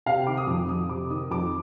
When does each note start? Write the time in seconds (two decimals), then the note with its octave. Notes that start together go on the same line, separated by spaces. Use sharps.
0.06 C3 F5
0.17 G5
0.27 D#3 D6
0.37 D#6
0.47 F2 D6
0.68 F2 D#6
0.89 C3 D6
1.10 D#3 D#6
1.31 F2 D6